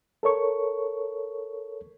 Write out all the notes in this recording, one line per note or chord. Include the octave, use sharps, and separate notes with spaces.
A4 A#4 C#5 C#6